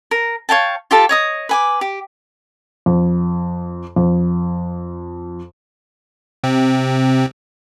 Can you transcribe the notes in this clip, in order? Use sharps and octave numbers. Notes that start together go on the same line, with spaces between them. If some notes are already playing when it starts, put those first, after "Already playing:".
A#4
C#5 F5 G5 A5
F4 G4 A4 A5
C#5 D#5 D#6
B4 G#5 D6
G4
F2
F2
C3 C4